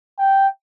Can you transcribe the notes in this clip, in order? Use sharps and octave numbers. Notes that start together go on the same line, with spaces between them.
G5